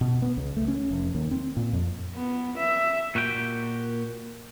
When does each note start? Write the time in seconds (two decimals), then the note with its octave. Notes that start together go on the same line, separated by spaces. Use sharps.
0.01 B2
0.22 B3
0.37 C#2
0.57 A3
0.68 C#4
0.91 F1
1.15 D#2
1.31 C4
1.57 A#2
1.73 F2
2.15 B3
2.58 E5
3.15 A#2 F#4 G4 A#4 G5